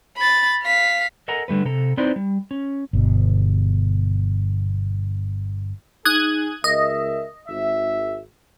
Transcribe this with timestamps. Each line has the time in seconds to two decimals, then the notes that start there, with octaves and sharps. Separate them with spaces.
0.17 B5 A6
0.64 F5 B6
1.28 A4 A#4 D#5 F#5 G#5 A#5
1.48 D3 G3 A3 B4
1.65 C3 A4 A#5
1.97 C4 D#4 E4 B4 C5 D5
2.16 G3
2.51 C#4
2.93 G1 B2
6.05 D#4 G#4 D#6 F#6 G#6
6.64 C#2 A#4 D#5 E5
7.49 G#1 E5